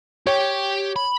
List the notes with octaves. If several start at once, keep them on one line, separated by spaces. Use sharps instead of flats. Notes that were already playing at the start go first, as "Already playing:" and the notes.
G4 C#5 G5
B5